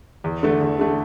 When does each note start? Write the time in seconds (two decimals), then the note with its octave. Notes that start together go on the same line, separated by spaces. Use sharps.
0.24 E2
0.43 D3 A3
0.61 E2
0.79 D3 A3